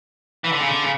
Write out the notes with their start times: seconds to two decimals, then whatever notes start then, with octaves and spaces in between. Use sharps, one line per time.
0.44 E3
0.52 D3
0.61 C#3
0.68 D3
0.82 C#3